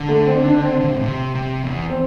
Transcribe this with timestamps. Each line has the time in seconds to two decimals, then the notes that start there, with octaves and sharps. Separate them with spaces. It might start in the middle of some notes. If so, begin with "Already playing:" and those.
Already playing: D3
0.09 A3
0.26 C4
0.45 D4
0.63 C4
0.81 D3
0.88 C3
0.95 A2
1.03 C3
1.35 C3
1.63 E2
1.90 C4